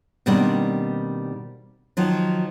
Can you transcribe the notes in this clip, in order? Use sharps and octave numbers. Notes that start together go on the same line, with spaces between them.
B2 D#3 G3 A#3 C4 D4
D#3 F3 F#3